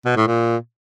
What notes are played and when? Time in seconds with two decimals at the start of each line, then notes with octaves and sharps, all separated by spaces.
0.05 B2
0.16 A2
0.27 A#2